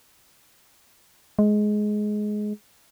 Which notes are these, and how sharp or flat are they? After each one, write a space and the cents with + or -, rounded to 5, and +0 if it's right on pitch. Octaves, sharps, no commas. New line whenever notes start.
G#3 +15